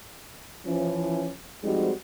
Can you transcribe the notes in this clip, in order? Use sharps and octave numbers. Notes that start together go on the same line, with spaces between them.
E3 F3 C#4
F3 G3 G#3 C4 D#4 F#4